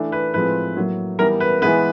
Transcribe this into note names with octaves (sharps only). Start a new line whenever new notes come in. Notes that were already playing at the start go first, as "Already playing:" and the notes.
Already playing: E3 A3 D4
B4
A2 F3 G#3 C4 B4
A2 F#3 A#3
E3 G3 B3 A#4
B4
E3 G#3 B3 B4